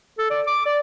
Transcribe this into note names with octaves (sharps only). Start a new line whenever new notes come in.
A4
D5
D6
D5